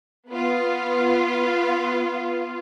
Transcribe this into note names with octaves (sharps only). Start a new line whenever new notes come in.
B3 F4